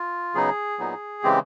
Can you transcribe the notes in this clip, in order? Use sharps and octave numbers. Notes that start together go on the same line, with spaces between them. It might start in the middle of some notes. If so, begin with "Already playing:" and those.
Already playing: F4
C#3 F#3 B3 D#4 G#4
A#2 F#3 B3 D#4
C#3 E3 G#3 C4 G4